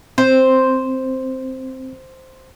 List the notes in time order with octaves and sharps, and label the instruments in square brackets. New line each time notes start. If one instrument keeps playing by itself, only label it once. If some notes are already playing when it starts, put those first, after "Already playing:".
[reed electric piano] C4 [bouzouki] C5